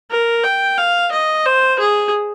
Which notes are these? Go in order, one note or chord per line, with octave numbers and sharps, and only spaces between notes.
A#4
G5
F5
D#5
C5
G#4